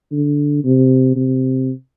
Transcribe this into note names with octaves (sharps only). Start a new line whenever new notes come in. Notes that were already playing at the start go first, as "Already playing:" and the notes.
D3
C3
C3